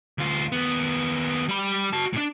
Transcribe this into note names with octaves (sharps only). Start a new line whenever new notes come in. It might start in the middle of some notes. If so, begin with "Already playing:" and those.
D2 F4
D#2 B3
G3 B5
F#4 A5
A2 D4